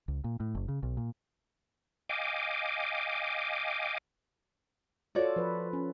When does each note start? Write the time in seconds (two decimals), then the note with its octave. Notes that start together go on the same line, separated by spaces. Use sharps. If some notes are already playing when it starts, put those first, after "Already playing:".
0.08 C#2
0.24 A#2
0.40 A2
0.55 F#1
0.68 C#3
0.83 B1
0.97 A#2
2.09 D#5 F5 G5 G#5 D6
5.15 F4 F#4 A4 C#5 D5
5.36 F3 B4
5.73 C#4